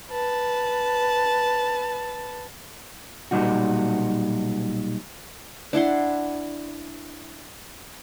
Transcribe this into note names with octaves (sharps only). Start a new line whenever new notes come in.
B4 A5
B1 A#2 G3 D#4 F#4
D4 E4 F#5 C6